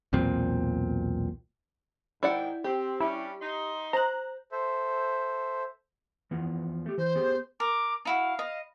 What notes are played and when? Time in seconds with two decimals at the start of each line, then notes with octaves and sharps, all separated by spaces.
0.13 B1 E2 A#2 C4
2.23 G#2 D#3 E4 D5 F#5 G5
2.64 C4 G4
3.00 G3 C#4 D4 E4
3.41 D#4 C6
3.93 C5 A#5 F#6
4.52 A4 C5 E5
6.31 E3 F3 B3
6.86 A3 G4
6.98 E3 C5
7.16 B3 G4 G#4
7.60 A#4 D6
8.05 D#4 E4 F#4 F5
8.39 D#5